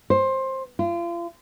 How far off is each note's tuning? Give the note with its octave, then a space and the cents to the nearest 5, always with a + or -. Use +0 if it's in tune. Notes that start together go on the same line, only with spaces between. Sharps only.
C5 +20
F4 -35